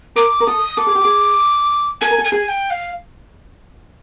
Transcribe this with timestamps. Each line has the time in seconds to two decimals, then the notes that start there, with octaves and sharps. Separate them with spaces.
0.16 A#4 D6
0.40 A#4
0.47 A4 D#6
0.77 A4 D6
0.86 G#4
0.95 G4
1.05 G#4
2.01 A4 G#5
2.11 A#4
2.18 A4
2.25 G#5
2.32 G#4
2.48 G5
2.70 F5